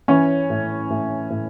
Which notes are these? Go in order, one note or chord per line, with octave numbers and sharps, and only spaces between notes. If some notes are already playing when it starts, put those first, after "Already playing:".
E3 C#4 C#5
A2
A2
A2